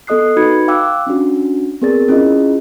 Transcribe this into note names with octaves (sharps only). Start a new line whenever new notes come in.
B3 A4 D#5 D#6 F#6 C7
D#4 F#4 B4 B5 G#6 C#7
F5 G5 D6 E6 F#6
C#4 D4 F#4
B3 C4 G#4 A#4 D5 A6
C#4 E4 F4 G#4 D#5